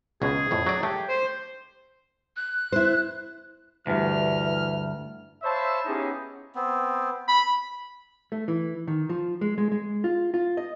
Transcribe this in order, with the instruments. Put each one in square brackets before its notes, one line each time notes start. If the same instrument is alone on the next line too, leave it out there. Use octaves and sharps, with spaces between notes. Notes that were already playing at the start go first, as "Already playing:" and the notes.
[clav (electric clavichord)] C#2 B2 G#3 [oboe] G#4
[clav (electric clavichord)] F2 A2
F#3 D5
[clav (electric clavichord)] A3 [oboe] G4
[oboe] C5
[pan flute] F#6
[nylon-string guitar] E4 C5
[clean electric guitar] D2 G2 [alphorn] E3 [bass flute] E5 [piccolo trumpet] F6
[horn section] C5 C#5 E5 F5 A5 B5
B3 C#4 D#4 E4 G4 G#4
[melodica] B3 C4
[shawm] B5
[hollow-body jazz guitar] A3
E3
D#3
F3
G#3
G#3
G#3
F4
F4
D#5